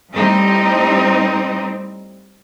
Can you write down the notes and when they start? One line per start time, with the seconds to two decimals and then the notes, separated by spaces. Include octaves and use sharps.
0.13 A2 G3 C4 D#4